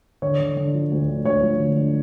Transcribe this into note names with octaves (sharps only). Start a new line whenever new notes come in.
D3 C#5
D3
D3
F3
D2
D3
D2 C#5
F3
D3
D3